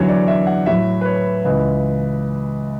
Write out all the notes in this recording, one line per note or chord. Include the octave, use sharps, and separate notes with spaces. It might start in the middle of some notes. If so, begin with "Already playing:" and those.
Already playing: E2 D3 F#3 C#5
D5
E5
F#5
A2 F#3 E5
B4
C#5
C#2 C#3 E3 B4